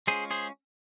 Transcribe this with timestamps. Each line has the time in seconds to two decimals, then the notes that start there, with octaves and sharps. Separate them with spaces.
0.07 G#3 C#4 F4 G#4 C5
0.31 G#4 C5